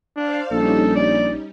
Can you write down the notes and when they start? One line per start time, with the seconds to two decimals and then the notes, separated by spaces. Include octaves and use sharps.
0.17 D4 C5 D5 F5
0.51 A#1 G3 C#4 D#4 A4
0.96 D5